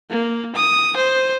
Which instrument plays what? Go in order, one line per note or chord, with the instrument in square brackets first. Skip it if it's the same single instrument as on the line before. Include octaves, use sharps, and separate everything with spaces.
[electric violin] A#3
D#6
C5